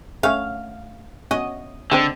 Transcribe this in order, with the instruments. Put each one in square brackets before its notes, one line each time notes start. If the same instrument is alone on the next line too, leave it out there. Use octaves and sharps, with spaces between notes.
[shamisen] A3 C#4 [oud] F5
[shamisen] B3 C#4 F#4 [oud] D#5
[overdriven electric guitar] D3 [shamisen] G#3 C4 C5